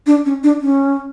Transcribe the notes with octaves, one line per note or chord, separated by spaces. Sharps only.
D4
C#4
D4
C#4